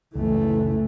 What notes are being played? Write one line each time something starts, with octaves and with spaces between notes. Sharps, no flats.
F#1 C#2 E3 A3